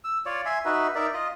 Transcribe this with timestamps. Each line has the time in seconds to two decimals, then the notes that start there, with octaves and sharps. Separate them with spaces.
0.04 E6
0.26 F4 C#5 D5
0.46 E5 G#5 C6
0.65 D#4 F#4 B4 E5
0.95 D#4 A#4 D5 E5
1.14 F4 D#5